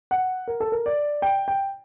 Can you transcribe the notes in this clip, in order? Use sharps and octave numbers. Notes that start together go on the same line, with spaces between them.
F#5
A#4
A4
A#4
D5
G5
G5